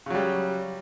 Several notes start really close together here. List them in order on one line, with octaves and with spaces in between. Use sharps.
C#3 F#3 G3